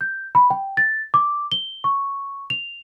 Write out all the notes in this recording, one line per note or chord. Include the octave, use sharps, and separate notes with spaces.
G6
B5
G5
A6
D6
G7
C#6
F7